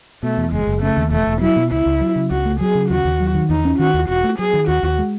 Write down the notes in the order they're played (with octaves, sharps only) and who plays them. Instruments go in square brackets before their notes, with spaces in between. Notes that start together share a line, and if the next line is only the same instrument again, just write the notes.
[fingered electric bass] B2 [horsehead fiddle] A3
[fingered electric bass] E2
[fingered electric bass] F#1 [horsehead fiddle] G#3
[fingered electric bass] F#1
[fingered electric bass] C#3 [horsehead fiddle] A3
[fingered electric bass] D#2
[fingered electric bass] E1 [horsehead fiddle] A3
[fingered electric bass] E1
[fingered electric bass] F#3 [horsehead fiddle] E4
[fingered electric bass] B2
[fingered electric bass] C#2 [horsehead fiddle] E4
[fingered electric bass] C#2
F#3
C#3
[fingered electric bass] C#2 [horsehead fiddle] F#4
[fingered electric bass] A3
[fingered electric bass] F#3 [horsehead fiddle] G#4
[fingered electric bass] C#3
[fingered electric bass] D#2 [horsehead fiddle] F#4
[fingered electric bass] D#2
F#3
D#3
[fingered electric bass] E2 [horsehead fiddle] D#4
[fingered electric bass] C#4
[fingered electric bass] D#3 [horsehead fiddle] F#4
[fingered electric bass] D#2
[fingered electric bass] E1 [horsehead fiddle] F#4
[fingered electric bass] A3
[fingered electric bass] F#3 [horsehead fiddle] G#4
[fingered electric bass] D#3
[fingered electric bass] D#2 [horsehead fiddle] F#4
[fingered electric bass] D#2
G#3